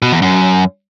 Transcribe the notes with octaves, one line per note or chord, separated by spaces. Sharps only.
B2
E2
F#2